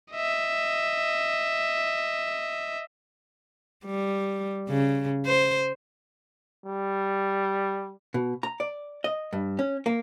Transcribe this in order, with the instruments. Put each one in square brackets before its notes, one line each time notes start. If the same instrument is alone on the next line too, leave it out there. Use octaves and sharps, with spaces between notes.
[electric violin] D#5 E5
[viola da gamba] G3
C#3
C5
[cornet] G3
[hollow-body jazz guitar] B2
A#5
D5
D#5
G2
C#4
A#3